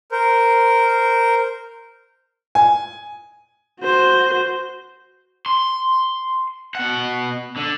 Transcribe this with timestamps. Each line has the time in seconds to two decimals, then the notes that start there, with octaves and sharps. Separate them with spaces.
0.12 A#4 C5
2.55 G#5
3.81 F#4 C5
5.46 C6
6.75 B2 F#5
7.57 D3